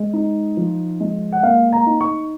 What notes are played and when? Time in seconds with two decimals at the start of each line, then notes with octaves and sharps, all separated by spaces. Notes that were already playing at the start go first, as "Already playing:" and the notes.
Already playing: G#3
0.13 D#4
0.57 F3
1.00 G#3
1.33 F#5
1.43 A#3 F5
1.73 A#5
1.87 D#4
2.01 C#6